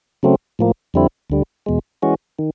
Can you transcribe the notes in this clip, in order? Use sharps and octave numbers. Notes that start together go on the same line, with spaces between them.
C#3 F#3 A3 C4
A2 F3 A#3
F2 D3 G3 C4 E4
D2 D3 G3
E2 B2 G#3
E3 G#3 C#4 F#4
D#3